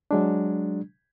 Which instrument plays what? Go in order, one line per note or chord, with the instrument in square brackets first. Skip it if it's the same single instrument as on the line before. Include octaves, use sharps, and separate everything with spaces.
[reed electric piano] F#3 G#3 D4